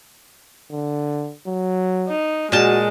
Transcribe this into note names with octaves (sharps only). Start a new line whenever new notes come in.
D3
F#3
D#4
A#2 G#3 F#4 A5